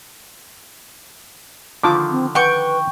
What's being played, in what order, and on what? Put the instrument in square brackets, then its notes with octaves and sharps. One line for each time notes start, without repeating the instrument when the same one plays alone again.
[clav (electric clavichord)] D3 D#3 F3 [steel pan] F4 A5 D6
[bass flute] C4
[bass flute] B4 [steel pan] F#5 [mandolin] G5 C#6